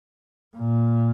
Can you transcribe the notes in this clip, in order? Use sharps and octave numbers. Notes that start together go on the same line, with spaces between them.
A#2